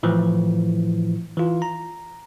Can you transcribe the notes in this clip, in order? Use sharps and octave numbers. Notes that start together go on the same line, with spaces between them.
A2 E3 F3
E3 F4
A#5